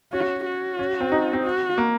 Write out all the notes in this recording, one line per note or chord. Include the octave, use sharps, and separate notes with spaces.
C#4 F#4
F#4
C#4
C4
D#4
C4
F#4
A#3